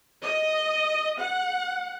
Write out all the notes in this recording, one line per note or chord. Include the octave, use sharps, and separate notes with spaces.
D#5
F#5